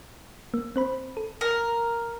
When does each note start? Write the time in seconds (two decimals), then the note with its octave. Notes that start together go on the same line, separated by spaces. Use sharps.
0.54 A#3
0.76 C4 C5 B5
1.17 A4
1.41 A#4